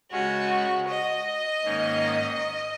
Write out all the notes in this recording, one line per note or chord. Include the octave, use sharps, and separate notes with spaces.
C#3 G#3 C#4 F#4
D#5
G#2 D#3 A#3 C#4